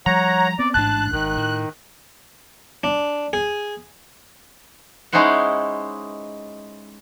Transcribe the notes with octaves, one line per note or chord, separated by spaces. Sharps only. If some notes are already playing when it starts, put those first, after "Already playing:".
F3 G3 C#5 F#5 A#5
B3 C4 D5
A1 G#2 D4 A5 F#6
G#1 D#3
A2
D4
G#4
G#3 C#4 D#4 E4 C5 F#5